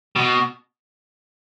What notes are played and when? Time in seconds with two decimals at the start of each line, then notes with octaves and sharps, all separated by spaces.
0.16 B2